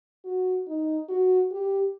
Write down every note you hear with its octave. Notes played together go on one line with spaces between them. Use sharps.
F#4
D#4
F#4
G4